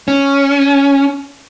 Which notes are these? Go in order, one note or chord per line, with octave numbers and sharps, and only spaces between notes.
C#4